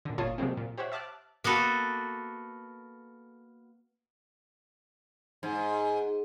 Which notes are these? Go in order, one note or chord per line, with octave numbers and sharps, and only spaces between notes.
A#2 D3
G1 A#2 F4 C#5 A5 D#6
C3 F3 F#3 G#3 A#3 C4
A#2
G4 C5 C#5 E5 F#5
E5 A5 D6 F6 F#6
A#3 B3 F#4 A4
G#2